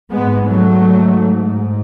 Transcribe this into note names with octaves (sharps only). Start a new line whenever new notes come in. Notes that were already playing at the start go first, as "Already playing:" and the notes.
G#2 G#3 B3
F#3 A3